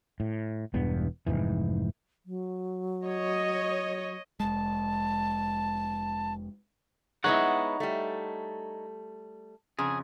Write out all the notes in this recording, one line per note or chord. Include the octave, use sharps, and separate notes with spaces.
A2
E1 E2 G2 B3
F1 B1 G#2 E3
F#3
C#5 D#5
F1 G#3 A5
G#3 B3 D#4 E4 C#5 F#5
G3 A3
F2 C#3 G#4